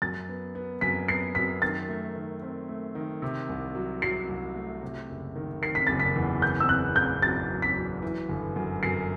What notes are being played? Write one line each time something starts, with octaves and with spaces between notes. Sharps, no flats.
F#2 A6
B3
B3
F#2 B6
B3 C7
F#2 B6
D#3 A6
A3
D#3
C4
A3
D#3
C3
C2
F#3
F#3 C7
C2
A3
C3
F#1
D#3
D#3 C7
B6
F#1 A6
B6
E2
B3 G6
E6
B3 F#6
A1 G6
F#3 A6
F#3
B6
F#3
E3
G1
F#2
F#2 C7